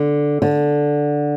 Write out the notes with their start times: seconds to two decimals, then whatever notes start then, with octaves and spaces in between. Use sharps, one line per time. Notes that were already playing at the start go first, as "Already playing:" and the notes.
Already playing: D3
0.42 D3